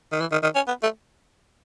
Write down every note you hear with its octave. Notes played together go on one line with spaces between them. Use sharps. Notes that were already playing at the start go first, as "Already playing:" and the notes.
D#3
E3
D#3
D#3
C#4
B3
A3